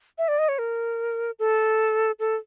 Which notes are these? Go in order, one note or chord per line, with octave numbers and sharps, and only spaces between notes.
E5
D5
D#5
C#5
A#4
A4
A4